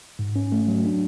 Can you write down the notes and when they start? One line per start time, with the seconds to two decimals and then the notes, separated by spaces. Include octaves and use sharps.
0.19 G#2
0.36 C#4
0.52 A3
0.68 F#3
0.85 D4